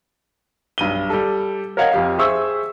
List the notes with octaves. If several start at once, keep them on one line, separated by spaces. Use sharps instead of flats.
B1 G2 D#7 G7
G3 A4
A#4 C#5 D#5 F5 F#5 G#6
F2 G4 F5
G#4 C5 E5 C#6 E6